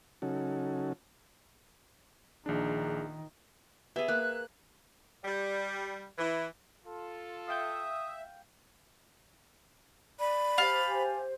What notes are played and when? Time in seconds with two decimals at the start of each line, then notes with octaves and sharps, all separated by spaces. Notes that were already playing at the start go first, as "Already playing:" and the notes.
0.22 C#3 F#3 C#4 D#4 F#4 A4
2.46 A#1 D#3 D4 G#4
3.96 B3 G4 G#4 E5
4.08 A#3 F#6
5.25 G3
6.18 E3
6.85 F4 A4
7.48 E5 F5 G5 D#6 G6
10.20 D5 B5
10.58 G4 C5 F5 A5
10.89 G#5